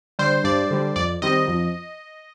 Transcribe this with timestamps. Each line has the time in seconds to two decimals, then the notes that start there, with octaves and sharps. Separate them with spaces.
0.19 D3 G3 C5
0.44 G2 D5
0.71 D3 G3
0.96 F2 D5
1.22 D#3 G3 C4 D#5
1.48 F2